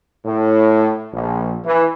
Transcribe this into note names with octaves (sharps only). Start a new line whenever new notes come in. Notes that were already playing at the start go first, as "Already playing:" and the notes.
A2
A#1
E3